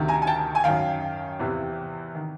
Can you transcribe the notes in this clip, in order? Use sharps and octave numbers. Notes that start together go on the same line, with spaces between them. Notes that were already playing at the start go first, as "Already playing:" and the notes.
Already playing: D2 C3 D#3
G#5 A#5
G#5
G5 A5
G#5
F#2 D#3 F5 G5
E2 C3 E3
D#3